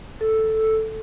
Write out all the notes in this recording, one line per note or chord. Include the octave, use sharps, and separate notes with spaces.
A4